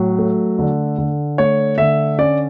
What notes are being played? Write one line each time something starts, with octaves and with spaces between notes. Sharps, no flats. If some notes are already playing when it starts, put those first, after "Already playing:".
Already playing: A2 F#3
A3
D3
D3
A3 C#5
D3 E5
C#4 D5